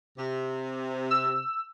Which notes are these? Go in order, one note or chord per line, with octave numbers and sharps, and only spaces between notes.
C3
E6